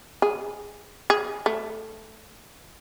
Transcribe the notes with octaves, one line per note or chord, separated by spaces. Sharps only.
G#4
G#4
A3